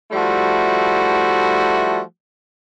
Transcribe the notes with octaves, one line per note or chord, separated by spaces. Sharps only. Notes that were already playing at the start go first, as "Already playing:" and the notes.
F3 G3 A3 E4 F#4